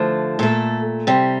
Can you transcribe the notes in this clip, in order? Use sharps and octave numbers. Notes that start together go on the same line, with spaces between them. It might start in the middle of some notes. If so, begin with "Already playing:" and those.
Already playing: D3 F3 A3
A#2 A3 A4
C3 G3